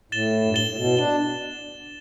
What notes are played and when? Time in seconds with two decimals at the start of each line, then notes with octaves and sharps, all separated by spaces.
0.12 A2 A6 E7 G7
0.45 G2
0.54 A2 A6 E7 G7
0.67 A2
0.76 B2
0.97 D4 E7 G7